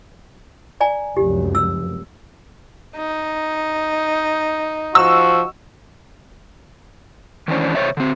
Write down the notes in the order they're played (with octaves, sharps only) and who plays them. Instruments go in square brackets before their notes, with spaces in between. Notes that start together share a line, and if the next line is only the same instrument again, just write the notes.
[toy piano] D5 G#5 A#5
[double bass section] F1 C#2 F#2 [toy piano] G4
[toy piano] E6
[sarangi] D#4
[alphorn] F3 [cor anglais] F#4 [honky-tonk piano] E6
[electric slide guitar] D#3 E3 C#4 D4 C5
C3 C5 C#5 E5
D3 C4